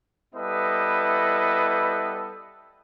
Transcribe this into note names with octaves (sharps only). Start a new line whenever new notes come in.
G3 B3 E4 A4 B4 D#5